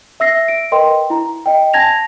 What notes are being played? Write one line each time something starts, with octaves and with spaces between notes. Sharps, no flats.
E5 E6 A#6 C7
D7
A#4 B4 D#5 G5 C6
E4 A#5
D#5 G5
G#5 A5 G#6 A#6 F7